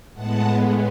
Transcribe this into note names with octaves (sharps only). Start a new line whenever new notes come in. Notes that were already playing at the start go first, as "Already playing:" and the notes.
A2 G#3 B3 F#5 A5